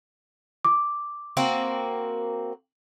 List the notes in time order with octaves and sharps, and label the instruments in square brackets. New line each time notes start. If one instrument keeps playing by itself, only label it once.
[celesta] D6
[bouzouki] A#3 C4 F#4